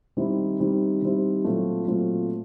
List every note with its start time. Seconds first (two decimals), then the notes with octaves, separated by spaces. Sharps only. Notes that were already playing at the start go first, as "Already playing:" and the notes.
0.17 D#3 G3 C4 E4
0.59 D#3 G3 C4 E4
1.02 D#3 G3 C4 E4
1.44 A#2 F#3 A3 C4 F4
1.87 A#2 F#3 A3 C4 F4